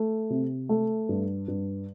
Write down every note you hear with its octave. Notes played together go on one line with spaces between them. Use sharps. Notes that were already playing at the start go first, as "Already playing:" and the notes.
Already playing: A3
C3
A3
G2
G2